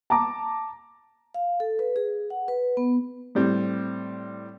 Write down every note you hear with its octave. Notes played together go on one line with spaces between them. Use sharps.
A5 A#5 D6
F5
A4
B4
G#4
F#5
B4
B3
A2 G3 C4